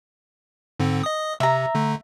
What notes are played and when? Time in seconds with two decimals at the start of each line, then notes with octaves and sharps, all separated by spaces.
0.80 G#2 D3 C4
1.03 D#5 D#6
1.40 C3 E5 A#5
1.75 D3 A3